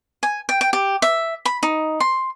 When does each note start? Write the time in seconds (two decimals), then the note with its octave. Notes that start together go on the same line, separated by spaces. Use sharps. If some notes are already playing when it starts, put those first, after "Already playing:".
0.23 G#5
0.49 G5
0.61 G5
0.73 G4
1.02 E5
1.45 B5
1.63 D#4
2.00 C6